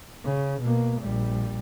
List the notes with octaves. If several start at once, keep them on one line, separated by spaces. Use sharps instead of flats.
C#3
B2 A#3
A#1 G3